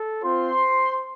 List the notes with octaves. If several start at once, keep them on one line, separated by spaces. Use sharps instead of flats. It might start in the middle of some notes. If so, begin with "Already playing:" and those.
Already playing: A4
C4 F4 C5 C6